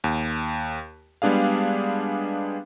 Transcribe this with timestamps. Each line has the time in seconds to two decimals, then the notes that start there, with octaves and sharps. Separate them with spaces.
0.04 D#2
1.22 G3 G#3 B3 D4 G#4 F5